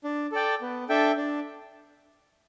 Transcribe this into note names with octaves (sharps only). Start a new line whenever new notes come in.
D4
A4 D5 G5
B3
D4 A4 E5 G5
D4